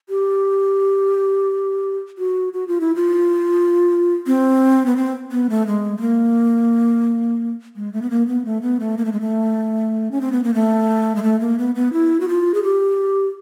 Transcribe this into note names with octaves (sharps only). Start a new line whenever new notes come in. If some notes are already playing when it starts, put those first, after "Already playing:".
G4
F#4
F#4
F4
E4
F4
C4
B3
C4
B3
A3
G#3
A3
A#3
G#3
A3
B3
A#3
B3
A3
B3
A3
A#3
A3
G#3
A3
C#4
C4
B3
A#3
A3
G#3
A3
A#3
B3
B3
E4
F#4
F4
G#4
G4